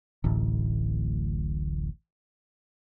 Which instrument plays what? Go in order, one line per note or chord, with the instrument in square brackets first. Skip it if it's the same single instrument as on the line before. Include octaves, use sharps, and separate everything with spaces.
[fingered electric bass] D1 A1